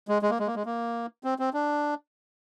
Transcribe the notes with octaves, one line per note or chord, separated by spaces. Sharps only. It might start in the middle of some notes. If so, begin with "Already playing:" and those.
G#3
G#3
A#3
G#3
A#3
G#3
A#3
C4
C4
D4